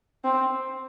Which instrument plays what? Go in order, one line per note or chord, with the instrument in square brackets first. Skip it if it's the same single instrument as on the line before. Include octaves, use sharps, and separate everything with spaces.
[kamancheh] C4